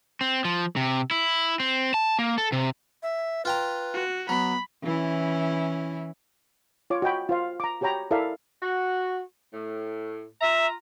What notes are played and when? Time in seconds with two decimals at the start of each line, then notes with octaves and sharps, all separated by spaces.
0.21 C4
0.45 F3
0.76 C3
1.11 E4
1.60 C4
1.94 A5
2.19 A#3
2.38 A4
2.52 C3
3.03 E5
3.45 F4 B4 G5 A#5
3.94 F#4
4.29 F#3 B3 B5
4.83 E3 C#4 E4
6.90 F4 C#5 D6
7.02 F#4 D#5 G5 B5
7.29 F4 C5 F5
7.60 A#5 D6
7.81 F#4 G4 C#5 G5 A#5 B5
8.11 E4 A4 A#4 D5 E5 F5
8.62 F#4
9.53 A2
10.41 F4 E5 A#5